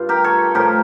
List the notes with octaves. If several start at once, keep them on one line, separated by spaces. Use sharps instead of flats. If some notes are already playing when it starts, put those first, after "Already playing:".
Already playing: G2 F4
G4 A#4
A4 C#5
A2 F3 G4 A#4